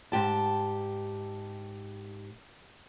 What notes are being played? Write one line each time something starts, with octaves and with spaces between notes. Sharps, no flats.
G#2 G4 A5